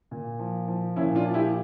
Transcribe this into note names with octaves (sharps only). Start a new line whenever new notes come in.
A#2
F3
F3
A#2 C#4 E4
D4 F4
F3
E4 G4